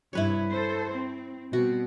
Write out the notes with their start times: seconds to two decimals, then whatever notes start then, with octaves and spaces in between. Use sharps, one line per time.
0.13 G2 C3 E4 B4 C#5
0.50 A4 C5
0.92 C4
1.53 B2 G3 C4 F#4